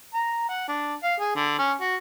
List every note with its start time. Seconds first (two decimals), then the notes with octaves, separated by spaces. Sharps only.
0.14 A#5
0.49 F#5
0.68 D4
1.03 F5
1.20 G#4
1.36 D3
1.59 C#4
1.81 F#4